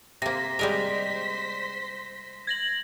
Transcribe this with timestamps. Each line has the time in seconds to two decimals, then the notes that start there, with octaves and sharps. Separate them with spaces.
0.22 C3 A#3 C5 C6 A#6 B6
0.59 G3 G#3 A#4
2.47 G#6 A#6 F#7